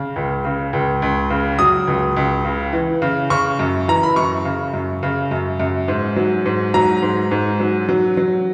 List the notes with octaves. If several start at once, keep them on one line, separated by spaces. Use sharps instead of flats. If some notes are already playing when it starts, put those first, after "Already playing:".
Already playing: C#3
C#2
C#3
C#2
C#2
C#3
F#3 D#6
C#2
C#2
C#3
E3
C#3
C#3 C#6
F#2
E3 A#5
B5
F#2 C#6
C#3
F#2
C#3
F#2
F#2
G#2
F#3
G#2
F#3 A#5
G#2
G#2
F#3
F#3
F#3